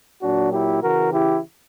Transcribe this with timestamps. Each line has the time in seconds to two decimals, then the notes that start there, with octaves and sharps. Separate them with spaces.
0.22 A#2 F#3 D4 F#4
0.51 E4 G4
0.82 C#3 E3 F#4 A#4
1.12 E4 G4